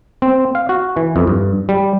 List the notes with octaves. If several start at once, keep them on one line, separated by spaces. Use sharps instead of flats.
C4
F5
F#4
E3
F2
G2
G3